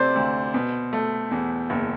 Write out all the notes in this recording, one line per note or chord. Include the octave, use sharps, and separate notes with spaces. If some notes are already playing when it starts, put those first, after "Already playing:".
Already playing: C3 A3 C5 D5
D2
B2
A3
E2
F#1